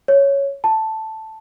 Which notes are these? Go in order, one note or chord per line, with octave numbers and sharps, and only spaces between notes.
C#5
A5